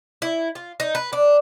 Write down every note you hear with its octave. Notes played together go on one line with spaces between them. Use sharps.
E4
F4
D#4
B4
D4